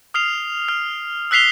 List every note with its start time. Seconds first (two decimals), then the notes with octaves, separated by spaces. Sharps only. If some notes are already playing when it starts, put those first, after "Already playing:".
0.14 D#6 F6 C7 F7
0.68 F6
1.31 E6 F#6 B6 C7 F7 G7